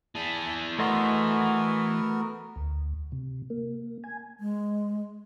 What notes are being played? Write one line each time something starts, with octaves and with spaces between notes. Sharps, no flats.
E3 G#4 A5
A3 B3 F#4 A#4 D#5 C6
D2
C3
A#3
G#5
G#3